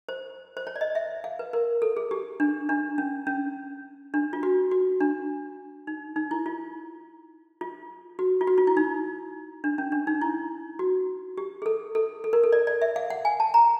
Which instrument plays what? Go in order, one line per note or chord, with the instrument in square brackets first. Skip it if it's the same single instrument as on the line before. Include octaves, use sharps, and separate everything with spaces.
[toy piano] C5
C5
C#5
D5
D#5
E5
F5
B4
A#4
A4
G#4
G4
D4
D4
C#4
C#4
D4
F4
F#4
F#4
D4
D#4
D#4
E4
F4
F4
F#4
F4
F#4
F4
E4
D#4
D4
C#4
D4
D#4
E4
F#4
G4
G#4
A4
A4
A4
A#4
A4
D5
D5
E5
F5
F#5
G#5
A5
A#5